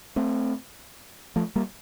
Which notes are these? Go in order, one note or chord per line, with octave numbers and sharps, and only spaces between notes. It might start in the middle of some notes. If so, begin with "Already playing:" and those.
A3 C4
F3 A3
G3 A#3